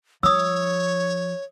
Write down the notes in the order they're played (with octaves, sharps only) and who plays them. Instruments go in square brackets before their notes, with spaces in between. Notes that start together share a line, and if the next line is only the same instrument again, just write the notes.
[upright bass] F3 [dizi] C#5 [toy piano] D#6 E6